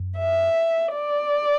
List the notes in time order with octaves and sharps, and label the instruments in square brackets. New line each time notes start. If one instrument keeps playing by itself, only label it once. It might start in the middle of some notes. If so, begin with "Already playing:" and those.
Already playing: [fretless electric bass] F#2
[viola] E5
D5